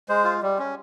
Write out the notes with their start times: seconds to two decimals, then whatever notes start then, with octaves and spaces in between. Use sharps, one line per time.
0.09 G#3 C5
0.24 F4
0.42 G3
0.59 C#4